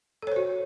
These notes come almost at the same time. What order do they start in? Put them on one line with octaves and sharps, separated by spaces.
A4 C#5 C5 F#4